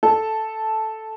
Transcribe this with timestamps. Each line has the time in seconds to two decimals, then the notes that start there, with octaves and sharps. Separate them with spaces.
0.03 A4